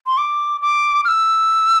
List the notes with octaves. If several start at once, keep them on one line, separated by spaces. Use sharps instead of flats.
C6
D6
D6
F6
E6